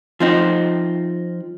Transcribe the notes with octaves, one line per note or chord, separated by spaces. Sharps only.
F3 C4 D#4